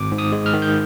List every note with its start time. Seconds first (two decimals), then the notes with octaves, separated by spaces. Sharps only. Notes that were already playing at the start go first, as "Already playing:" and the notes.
Already playing: G#1 D6
0.12 G#2
0.18 D#6
0.32 G#3
0.46 F6
0.53 D#3
0.62 G6